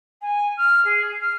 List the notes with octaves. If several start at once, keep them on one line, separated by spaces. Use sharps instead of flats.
G#5
F6
G#4
F6